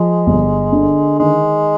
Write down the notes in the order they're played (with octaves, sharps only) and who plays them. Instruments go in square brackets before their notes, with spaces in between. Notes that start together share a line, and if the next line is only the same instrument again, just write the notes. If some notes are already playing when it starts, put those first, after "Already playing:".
Already playing: [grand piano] F3 [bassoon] G#3
[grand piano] G1
D3
[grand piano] D#3 [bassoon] G#3